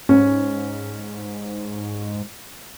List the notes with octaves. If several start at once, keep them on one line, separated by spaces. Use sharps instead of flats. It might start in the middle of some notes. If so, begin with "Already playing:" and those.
G#2 C#4